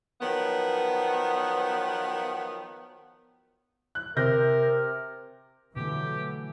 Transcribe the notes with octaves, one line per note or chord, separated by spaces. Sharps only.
D#3 F3 F#3 B3
F#6
C3 A#4 G6 A#6
B2 D3 E3 F#3 A3 G4